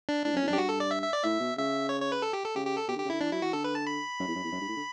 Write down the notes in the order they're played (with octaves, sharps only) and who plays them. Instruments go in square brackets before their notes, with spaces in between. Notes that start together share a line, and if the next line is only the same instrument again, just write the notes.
[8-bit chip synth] D4
[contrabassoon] A2 [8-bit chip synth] D4
[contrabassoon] F#2
[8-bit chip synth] C#4
[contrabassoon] E2
[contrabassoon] F#2 [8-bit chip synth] D4
[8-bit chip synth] G4
[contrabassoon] G2 [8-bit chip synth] F#4
[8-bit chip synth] A4
D5
E5
E5
D5
[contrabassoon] A2 [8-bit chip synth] E5
[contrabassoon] B2
[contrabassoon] C#3 [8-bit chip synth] E5
[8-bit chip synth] C#5
C#5
B4
A4
G4
A4
[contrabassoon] C#3 [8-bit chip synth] G4
[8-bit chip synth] G4
A4
[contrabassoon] B2 [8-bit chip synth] G4
[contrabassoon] D3
[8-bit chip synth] G4
[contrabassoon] C#3
[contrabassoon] D3 [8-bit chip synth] E4
[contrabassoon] E3 [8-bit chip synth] D4
[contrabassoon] F#3 [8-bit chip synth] E4
[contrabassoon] E3 [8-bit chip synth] F#4
[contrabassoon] D3 [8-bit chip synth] A4
[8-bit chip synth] B4
A5
B5
[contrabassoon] F#2
E2
F#2
E2
F#2
G2
A2
D3